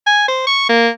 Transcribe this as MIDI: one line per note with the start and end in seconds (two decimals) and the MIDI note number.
0.07 0.27 80
0.28 0.43 72
0.47 0.69 85
0.69 0.88 58